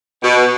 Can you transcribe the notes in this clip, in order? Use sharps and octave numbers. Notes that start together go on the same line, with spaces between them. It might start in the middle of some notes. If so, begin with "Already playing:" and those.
B2